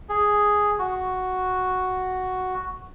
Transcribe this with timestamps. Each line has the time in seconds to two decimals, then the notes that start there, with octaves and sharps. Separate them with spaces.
0.09 G#4
0.79 F#4